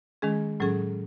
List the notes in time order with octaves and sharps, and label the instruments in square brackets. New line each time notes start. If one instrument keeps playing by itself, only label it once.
[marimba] D#3 G#3 C#4 G#4
A2 F#3 C#4 G#4